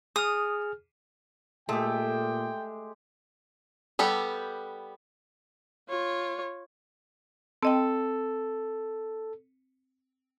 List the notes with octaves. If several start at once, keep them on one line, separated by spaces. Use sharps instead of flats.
G#4 D#6 F6
A#2 G#3 A3 G4 G5
G3 B3 G4 A4
F4 C#5
C4 A4 D#5 G5